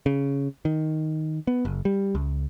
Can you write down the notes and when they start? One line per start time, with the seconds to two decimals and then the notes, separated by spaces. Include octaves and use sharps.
0.06 C#3
0.65 D#3
1.47 B3
1.65 F#1
1.85 G3
2.15 C#2